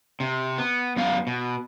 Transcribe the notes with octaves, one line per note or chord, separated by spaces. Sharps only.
C3
B3
F#2 B3 F5
B2